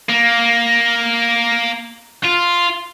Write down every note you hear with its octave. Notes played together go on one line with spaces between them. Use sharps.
A#3
F4